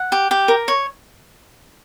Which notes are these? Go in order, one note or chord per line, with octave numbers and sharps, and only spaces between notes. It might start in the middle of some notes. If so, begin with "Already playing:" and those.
Already playing: F#5
G4
G4
A#4
C#5